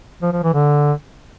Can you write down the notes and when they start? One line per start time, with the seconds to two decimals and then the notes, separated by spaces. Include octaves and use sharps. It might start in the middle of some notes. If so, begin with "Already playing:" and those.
0.22 F3
0.33 F3
0.43 E3
0.53 D3